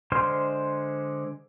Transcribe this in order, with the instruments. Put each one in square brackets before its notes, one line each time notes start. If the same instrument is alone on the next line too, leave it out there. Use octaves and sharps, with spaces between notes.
[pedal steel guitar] D3 G#3 C5 C6 F6